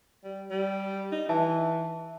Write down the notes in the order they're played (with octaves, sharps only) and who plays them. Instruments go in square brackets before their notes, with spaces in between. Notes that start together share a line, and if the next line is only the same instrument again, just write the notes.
[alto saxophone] G3
G3
D#4
[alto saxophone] E3 [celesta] E5 A5